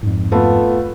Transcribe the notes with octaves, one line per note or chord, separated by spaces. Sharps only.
F2 G#2
A3 B3 F4